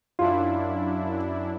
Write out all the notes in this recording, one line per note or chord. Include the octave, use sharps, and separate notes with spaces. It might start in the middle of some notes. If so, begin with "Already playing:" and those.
F#2 D4 E4 F4